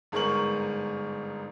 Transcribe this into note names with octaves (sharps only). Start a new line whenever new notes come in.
G1 G#2 G#4 A#4 C#6 F#7